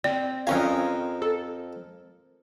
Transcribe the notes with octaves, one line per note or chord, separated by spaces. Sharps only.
C4 D5
F2 C#4 A#4 D#5 F5 G5 G#5 C6
A4